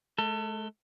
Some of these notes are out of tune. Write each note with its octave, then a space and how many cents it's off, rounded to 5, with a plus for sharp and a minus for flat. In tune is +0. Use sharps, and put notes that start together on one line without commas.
A3 -45 A4 +30